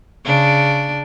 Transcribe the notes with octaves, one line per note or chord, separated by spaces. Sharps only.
C#3 D4